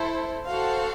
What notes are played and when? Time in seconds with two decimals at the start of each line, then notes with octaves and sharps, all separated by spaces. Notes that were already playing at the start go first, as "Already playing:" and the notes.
Already playing: E4 A4 C5
0.47 F#4 A4 C5 F5